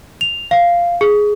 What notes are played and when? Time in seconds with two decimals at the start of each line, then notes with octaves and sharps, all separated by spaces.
0.21 F7
0.51 F5
1.01 G#4